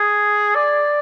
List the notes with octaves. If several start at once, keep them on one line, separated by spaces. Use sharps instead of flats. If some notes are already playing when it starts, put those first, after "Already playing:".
Already playing: G#4
D5